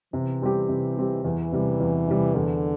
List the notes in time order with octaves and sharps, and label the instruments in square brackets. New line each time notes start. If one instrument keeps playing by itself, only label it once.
[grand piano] C3 [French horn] E3
[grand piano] G3 C4 G4
C3
G3 C4 G4
[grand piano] E2 [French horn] E3
[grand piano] C3 G3
E2
C3 G3
[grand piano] E2 [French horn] D3